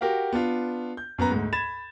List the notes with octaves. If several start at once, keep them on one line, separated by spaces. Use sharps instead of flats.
F#4 G4 A#4 F5 F#5
B3 D4 F4
G6
F#2 B3 B4 A#5
D2 G#2
B5 G#6 A6 E7